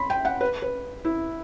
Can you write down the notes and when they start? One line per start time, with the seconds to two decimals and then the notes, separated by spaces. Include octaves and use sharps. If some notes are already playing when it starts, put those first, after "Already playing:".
Already playing: B5 C6
0.10 G5
0.25 F#5
0.41 B4
0.62 B4
1.05 E4